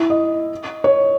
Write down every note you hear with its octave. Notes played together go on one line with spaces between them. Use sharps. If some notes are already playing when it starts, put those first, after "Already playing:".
Already playing: E4
D#5
C#5